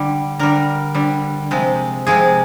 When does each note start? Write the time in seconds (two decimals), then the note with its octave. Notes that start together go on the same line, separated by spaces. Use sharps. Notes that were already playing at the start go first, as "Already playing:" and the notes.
Already playing: D3 G3
0.39 D3 G3 A#4
0.95 D3 G3
1.51 C3 F3 G#3
2.07 C3 F3 G#3 G#4